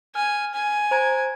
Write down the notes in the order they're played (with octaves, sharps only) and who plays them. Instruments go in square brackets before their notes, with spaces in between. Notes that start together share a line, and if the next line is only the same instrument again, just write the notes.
[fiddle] G#5 [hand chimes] F6
[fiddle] G#5
[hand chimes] C5 A#5 G#6